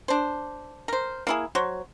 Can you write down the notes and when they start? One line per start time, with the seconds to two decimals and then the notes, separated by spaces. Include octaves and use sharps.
0.08 D4 C5
0.88 A#4 C5
1.27 A#3 E4 G#4
1.55 F#3 C5 C#5